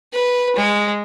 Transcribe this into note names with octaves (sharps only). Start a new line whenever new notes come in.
B4
G#3